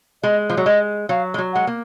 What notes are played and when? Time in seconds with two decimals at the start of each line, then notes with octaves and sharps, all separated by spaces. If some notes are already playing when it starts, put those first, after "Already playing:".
0.23 G#3 D#5
0.50 F3
0.57 F#3
0.66 G#3 D#5
1.09 F#3 F5
1.34 G#3
1.38 F#3
1.53 G#3 F#5
1.67 A#3